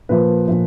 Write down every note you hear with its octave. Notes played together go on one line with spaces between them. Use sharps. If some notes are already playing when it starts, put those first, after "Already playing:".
A#2 F3 B4
A#2 F3